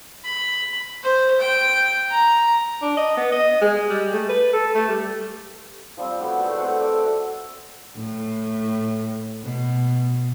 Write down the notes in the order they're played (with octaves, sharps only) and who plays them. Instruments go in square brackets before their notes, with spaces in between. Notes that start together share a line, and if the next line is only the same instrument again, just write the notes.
[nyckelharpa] B5
C5
G5
A#5
[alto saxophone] D4
D#5
B3
D#5
G#3
G3
A3
B4
A4
A3
G3
[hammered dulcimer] F3 G3 C4
A2 B3 F#4 G4
A3 G#4 A4
A3 C4 F#5
D5 E5
[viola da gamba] A2
B2